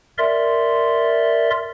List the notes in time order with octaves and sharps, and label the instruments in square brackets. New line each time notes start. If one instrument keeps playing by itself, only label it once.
[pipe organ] A#4 D5 E5 C6